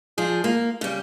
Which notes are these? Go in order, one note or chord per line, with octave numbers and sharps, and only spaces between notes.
F3 D4 G#4
A#3
C#3 G3